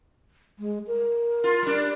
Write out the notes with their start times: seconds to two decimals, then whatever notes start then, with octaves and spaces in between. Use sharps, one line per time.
0.59 G#3
0.87 A#4
1.44 F4
1.62 G3 D4